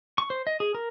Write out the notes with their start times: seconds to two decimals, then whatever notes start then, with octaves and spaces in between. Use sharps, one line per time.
0.18 C#6
0.30 C5
0.47 D#5
0.60 G#4
0.75 A#4